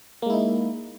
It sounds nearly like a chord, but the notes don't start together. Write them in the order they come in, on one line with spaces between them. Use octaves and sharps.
A#3 G#3 E4 D#4